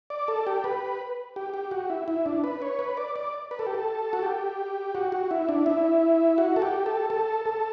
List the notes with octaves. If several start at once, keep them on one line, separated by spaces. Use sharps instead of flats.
D5
A4
G4
B4
G4
G4
F#4
E4
E4
D4
B4
C#5
B4
D5
D5
B4
A4
G4
A4
F#4
G4
F#4
F#4
E4
D4
E4
F#4
A4
G4
A4
A4
A4